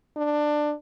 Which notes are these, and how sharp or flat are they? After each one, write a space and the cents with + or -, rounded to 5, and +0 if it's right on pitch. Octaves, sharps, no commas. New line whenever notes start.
D4 +15